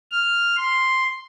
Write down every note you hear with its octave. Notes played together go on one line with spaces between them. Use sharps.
F6
C6